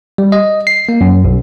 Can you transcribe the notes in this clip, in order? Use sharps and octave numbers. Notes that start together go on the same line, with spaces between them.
G3
D#5
C7
A#3
F#2
B1